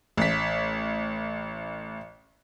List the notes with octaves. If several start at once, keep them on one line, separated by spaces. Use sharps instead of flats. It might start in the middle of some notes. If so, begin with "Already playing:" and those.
A1 B6